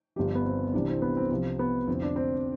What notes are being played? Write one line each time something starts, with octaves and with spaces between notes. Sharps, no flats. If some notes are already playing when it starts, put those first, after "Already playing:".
G1 G2 F3 G4
B3
C4
C2 C3 E3 G3 D4
C4
B3
C4
C2 C3 F3 C4
B3
F1 F2 D3 F3 C4
D4
C4